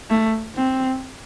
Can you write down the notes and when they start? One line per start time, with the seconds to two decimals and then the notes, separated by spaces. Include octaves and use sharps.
0.10 A3
0.56 C4